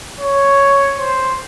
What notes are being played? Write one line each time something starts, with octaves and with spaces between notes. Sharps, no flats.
C#5
C5